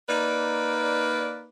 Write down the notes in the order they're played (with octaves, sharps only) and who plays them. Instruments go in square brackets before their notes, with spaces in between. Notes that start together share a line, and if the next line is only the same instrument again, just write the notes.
[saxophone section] A#3 D#4 B4 D5